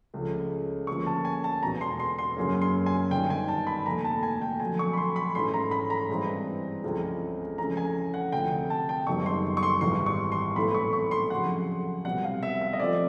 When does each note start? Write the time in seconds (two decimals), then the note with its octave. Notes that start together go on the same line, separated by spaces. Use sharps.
0.14 C#2 C#3 F3 A3 C#4
0.87 D2 D3 F3 A#3 C#4 C#6
1.07 A5
1.25 G#5
1.44 A5
1.63 E1 E2 B2 A#5
1.81 C6
2.00 C6
2.18 C6
2.37 F#2 C#3 F#3 A#3 C#4
2.62 C6
2.86 G#5
3.11 G1 G2 D#3 G5
3.30 G#5
3.48 A5
3.67 B5
3.86 F1 D#2 D3 A#5
4.05 A5
4.23 G#5
4.42 G5
4.60 F2 D3 F#3 G#5
4.79 C#6
4.93 B5
4.97 C6
5.16 B5
5.35 G#2 E3 A3 C#4 C6
5.54 A#5
5.71 B5
5.90 A#5
6.09 G2 E3 G#3 C4
6.84 C#2 C#3 F3 A3 C4
7.58 F2 C#3 E3 A3 C#4 A#5
7.77 G#5
8.14 F#5
8.32 D2 C3 F3 G5
8.52 G5
8.70 A5
8.89 G5
9.06 F#1 F#2 D#3 G3 B3 C#6
9.26 C6
9.57 C#6
9.63 C6
9.81 G#1 G#2 E3 G3 C6
10.06 C#6
10.32 C6
10.56 B1 A2 E3 A3 C4 B5
10.74 C#6
10.93 C#6
11.11 C6
11.30 F2 C#3 F#3 A3 F#5
12.04 C2 B2 G3 C4 F#5
12.24 F5
12.43 E5
12.61 E5
12.73 D#5
12.79 C2 C3 F3 A3 C4 D5